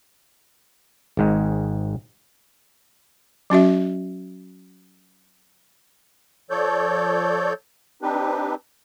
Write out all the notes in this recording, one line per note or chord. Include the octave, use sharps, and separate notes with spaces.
G#1 G#2 G#3
F#3 C#4 F#4 E5
F3 A4 C#5 D5 G6
C4 D4 D#4 G4 B4